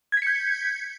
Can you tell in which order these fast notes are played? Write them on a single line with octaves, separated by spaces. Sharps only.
G#6 B6 C#7 G6